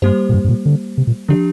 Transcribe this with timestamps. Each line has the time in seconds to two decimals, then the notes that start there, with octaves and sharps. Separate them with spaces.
0.02 G2 G3 A#3 G4 C5
0.29 A#2
0.34 G2
0.44 G2
0.49 A#2
0.66 D3
0.98 C3
1.07 A#2
1.28 D3 F3 D4 G4